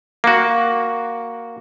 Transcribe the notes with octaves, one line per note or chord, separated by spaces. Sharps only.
A#3 F#4